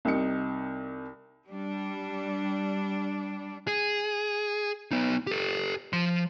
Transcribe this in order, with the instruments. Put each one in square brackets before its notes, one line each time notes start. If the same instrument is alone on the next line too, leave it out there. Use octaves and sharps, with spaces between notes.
[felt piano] C2 C3 D#4 C#7
[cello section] G3 D4
[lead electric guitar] G#4
B3 D#4
G4 A4
F3 C6